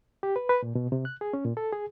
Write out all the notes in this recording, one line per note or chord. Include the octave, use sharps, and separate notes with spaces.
G4
B4
B4
A#2
B2
C3
F#6
G#4
C#4
A#2
A4
G#4